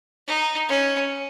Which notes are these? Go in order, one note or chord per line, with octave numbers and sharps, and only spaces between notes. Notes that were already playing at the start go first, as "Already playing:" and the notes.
D#4
C#4